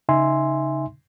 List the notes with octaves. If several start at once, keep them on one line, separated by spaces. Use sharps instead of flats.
C#3 D#4 E5 G#5 C6